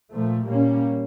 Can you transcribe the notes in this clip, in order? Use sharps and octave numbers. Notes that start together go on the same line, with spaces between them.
A#2 F3 A3
A#2 G3 A#3 C#4